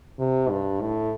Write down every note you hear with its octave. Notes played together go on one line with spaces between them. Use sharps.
C3
G2
A2